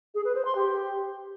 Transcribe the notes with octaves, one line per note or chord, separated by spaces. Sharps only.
G#4
B4
C5
C6
G4